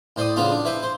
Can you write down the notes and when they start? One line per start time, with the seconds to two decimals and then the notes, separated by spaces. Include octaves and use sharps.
0.16 A2 C5 D5 D#6
0.36 C#3 B3 D4 F4 D6
0.52 D4
0.65 E4 B4 C5
0.83 C5